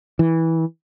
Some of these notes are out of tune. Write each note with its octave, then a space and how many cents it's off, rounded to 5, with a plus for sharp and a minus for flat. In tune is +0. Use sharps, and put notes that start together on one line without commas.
E3 -15